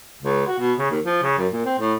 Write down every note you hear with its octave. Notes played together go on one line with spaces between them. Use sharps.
C#2
F#4
B2
C#3
D#2
F3
C#3
F#2
A#2
C4
A2